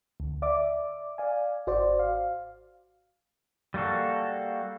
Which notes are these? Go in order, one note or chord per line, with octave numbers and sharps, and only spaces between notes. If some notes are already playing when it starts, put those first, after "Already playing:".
D2
D5 E5 D6
D5 F5 G#5
G#1 F#4 C5 D5
F5
G3 A#3 F#4 A4